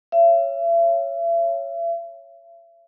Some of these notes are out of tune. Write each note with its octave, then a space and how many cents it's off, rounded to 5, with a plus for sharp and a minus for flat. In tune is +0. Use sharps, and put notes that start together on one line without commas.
C#5 +0 E5 +40